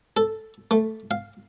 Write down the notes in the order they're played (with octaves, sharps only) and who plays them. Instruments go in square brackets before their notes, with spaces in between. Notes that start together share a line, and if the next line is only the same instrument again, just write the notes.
[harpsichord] A4
A3
F5